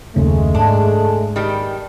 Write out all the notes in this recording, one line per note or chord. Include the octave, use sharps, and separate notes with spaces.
F#1 D#2 C#3 G#3 A3
G#2 D4
D#3 G3